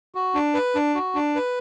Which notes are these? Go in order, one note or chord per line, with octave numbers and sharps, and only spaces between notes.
F#4
D4
B4
D4
F#4
D4
B4